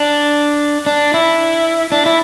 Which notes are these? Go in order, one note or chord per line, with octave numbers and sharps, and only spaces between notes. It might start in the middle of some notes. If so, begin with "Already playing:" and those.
Already playing: D4
D4
E4
D4
E4